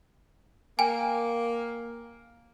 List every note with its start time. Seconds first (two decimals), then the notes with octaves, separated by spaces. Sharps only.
0.79 A#3 G5 G#5